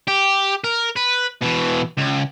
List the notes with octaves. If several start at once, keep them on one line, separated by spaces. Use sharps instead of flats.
G4
A#4
B4
B2 E3
C#2